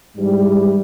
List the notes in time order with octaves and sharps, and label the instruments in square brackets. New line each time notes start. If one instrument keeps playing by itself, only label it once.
[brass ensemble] G#2 E3 G3